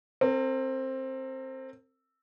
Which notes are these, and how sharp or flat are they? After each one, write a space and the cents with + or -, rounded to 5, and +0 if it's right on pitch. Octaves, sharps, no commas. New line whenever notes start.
C4 +15 A#4 -40